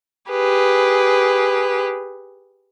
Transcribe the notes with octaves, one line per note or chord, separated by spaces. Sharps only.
G4 G#4 B4